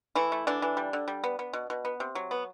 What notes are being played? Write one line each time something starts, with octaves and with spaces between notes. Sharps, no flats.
E3 A3 E4
A3
D3 E3 D4
E3
G3
D3
G3
B3
B3
B2
B2
B3
C3
F#3
B3